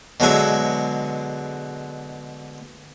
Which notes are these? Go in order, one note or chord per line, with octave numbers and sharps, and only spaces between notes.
B2 D3 F#3 G#3 E4 G#5